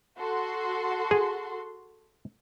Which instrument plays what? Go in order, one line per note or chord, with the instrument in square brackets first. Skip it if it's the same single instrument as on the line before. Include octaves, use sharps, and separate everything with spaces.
[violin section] F#4 A4 C6
[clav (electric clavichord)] G#4